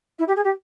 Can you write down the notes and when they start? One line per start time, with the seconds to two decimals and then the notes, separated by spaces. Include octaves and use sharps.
0.19 E4
0.27 G4
0.36 G#4
0.44 G4